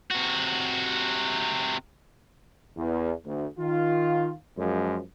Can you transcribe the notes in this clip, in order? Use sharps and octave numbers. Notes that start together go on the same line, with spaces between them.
C3 F#4
E2
D2
D#3 F4
F#2 F3 G#3